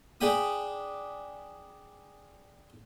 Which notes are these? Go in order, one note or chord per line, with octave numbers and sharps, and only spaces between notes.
D4 G#4 D5 G5 B5 D#6